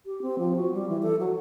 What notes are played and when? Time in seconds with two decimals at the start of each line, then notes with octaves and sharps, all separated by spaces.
0.06 G4
0.22 C4
0.39 F3
0.56 F#4
0.73 G3
0.89 E3
1.03 A4
1.20 F#3